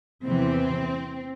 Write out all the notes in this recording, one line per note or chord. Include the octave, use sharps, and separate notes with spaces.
E2 C3 E3 C4